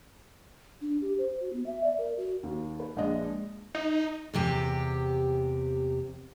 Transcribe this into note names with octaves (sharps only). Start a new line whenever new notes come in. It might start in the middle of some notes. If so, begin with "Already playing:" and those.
D4
G4
C5
F#4
B3
E5
D5
A#4
F#4
D#2
B4
A#1 G#3 D4 D#5
D#4
E2 C3 G4